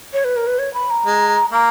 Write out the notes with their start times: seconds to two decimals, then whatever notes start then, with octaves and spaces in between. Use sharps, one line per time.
0.13 C#5
0.24 B4
0.36 A#4
0.47 B4
0.59 C#5
0.74 B5
0.90 A#5
1.06 G#3
1.52 A#3 A#5